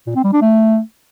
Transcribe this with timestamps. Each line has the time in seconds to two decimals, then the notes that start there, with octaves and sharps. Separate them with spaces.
0.07 A#2
0.15 C4
0.24 G3
0.33 D4
0.42 A3